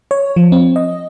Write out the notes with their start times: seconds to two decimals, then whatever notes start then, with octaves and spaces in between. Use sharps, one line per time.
0.11 C#5
0.36 F3
0.52 C4
0.76 D#5